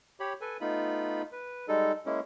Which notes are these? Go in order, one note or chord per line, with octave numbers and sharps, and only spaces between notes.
G4 C#5 B5
A4 B4 G#5
A3 B3 D#4 F4 B5
B4
G3 G#3 D#4 A4
G#3 A#3 C#4 E4